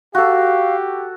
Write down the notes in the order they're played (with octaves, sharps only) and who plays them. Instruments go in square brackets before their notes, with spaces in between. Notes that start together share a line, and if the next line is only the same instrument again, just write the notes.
[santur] F#4 A4 [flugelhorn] G4 [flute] F5